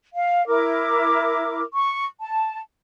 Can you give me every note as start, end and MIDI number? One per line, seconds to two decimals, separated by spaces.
0.15 0.45 77
0.47 1.62 64
0.47 1.62 70
0.47 1.62 86
1.73 2.05 85
2.20 2.60 81